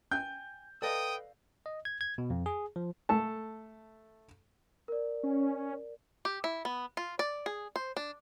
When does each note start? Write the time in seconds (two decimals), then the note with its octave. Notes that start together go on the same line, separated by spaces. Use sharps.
0.11 G5 G#5 G6
0.82 A4 B4 D5 D#5 F5 G5 D#6
1.66 D#5
1.85 G#6
2.01 G#6
2.18 B2
2.30 F2
2.46 G#4
2.76 F3
3.09 A3 A4 A5
4.88 A#4 D5
5.23 C#4
6.25 G4
6.44 E4
6.65 B3
6.97 F4
7.19 D5
7.46 G#4
7.76 C5
7.97 D4